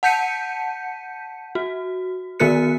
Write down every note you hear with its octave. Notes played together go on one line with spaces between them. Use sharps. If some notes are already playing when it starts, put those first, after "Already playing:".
F#5 A5 G6 B6 C#7 D#7
F#4
D#3 B3 F#4 A#4 F#6 C#7